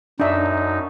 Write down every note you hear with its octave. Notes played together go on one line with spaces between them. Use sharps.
F#2 D4 D#4 E5